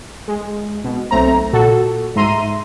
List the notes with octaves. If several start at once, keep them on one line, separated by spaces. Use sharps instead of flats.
G#3
B2
B1 A3 C4 A#5
A#2 F#4 A4
G#2 E5 A#5 C6 D#7